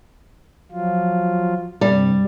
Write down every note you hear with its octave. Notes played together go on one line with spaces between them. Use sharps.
F3 F#3 F4
G2 C3 G3